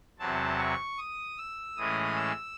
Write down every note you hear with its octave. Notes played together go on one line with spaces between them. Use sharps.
E2 C3 F#3 C4 A5
C#6
D#6
E6
A2 E3 G#3 C#4 D#6
E6